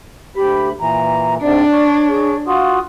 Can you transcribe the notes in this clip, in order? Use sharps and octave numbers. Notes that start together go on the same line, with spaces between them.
D2 G4 B5
A#2 E3 A#5
G#2 C3 D4 D5
C#5
G#4
F4 F#4 D#6